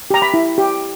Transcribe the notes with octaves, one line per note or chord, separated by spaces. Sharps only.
G4 A#5
B5
E4
G4